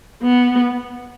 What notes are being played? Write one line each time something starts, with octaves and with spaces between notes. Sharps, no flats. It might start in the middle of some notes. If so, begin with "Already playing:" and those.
B3